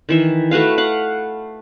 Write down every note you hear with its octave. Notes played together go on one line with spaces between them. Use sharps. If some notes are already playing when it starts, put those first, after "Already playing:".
D#3 E3 E5
A3 F#4 B4 F5
F5 F#5